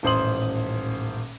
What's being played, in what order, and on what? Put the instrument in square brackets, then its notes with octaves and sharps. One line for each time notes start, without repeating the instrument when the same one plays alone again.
[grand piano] D#1 A1 C5 C6 D#6 F#7